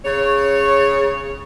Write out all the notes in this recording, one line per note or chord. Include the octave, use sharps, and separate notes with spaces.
C#3 C#5